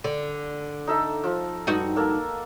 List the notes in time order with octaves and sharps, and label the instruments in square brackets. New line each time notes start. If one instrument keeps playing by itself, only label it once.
[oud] D3 [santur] D5
[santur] D#4 A4 E5
F3
[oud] G2 D#4 F#4
[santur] A#3 A4 F#5